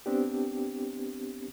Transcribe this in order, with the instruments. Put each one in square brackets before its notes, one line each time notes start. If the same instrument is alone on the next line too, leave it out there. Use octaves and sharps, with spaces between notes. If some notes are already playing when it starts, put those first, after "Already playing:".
[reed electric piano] B3 C4 D4 G4